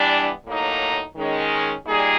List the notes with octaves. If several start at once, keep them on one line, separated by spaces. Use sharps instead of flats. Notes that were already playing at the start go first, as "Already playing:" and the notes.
Already playing: E3 G3 B3 D4
A2 F#3 A#3 D#4
D#3 G#3 C#4
A#2 G3 A#3 D#4 G#4